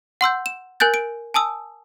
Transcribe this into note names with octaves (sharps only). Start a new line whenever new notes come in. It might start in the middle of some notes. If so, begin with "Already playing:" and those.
F#5 C6 E6 G6
E7
A#4 G#5 F#6 G6 A6
D7
G#5 A5 D#6 E6